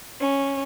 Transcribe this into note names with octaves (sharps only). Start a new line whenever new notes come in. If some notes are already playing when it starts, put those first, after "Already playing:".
C#4